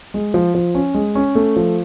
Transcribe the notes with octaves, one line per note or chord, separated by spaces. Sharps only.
G#3
F3
F3
C#4
G#3
C#4
A3
F3